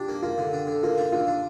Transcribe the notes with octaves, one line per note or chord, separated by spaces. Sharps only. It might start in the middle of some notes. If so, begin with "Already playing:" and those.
Already playing: D4 F4 G4
A#3
A#3 F4
D3
D4
D3
A#3 F4
D4
D3 F4
D4